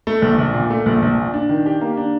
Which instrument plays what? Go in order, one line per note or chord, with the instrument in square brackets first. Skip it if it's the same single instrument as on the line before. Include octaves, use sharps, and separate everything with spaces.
[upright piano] A3
A#1
A#1
A#2
A3
A#1
A#1
A#2
D4
D#3
G4
A#3
D4